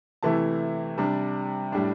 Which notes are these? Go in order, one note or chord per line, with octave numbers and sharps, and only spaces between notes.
C3 E3 A3 E4 A5
C3 G3 D4
A2 G3 D4